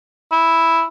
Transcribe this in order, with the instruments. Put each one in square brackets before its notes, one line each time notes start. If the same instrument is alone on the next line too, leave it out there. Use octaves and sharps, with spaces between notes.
[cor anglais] E4